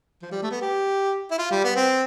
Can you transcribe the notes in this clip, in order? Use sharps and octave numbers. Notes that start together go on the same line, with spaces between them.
F3
G3
A3
B3
G4
E4
F4
G3
B3
C4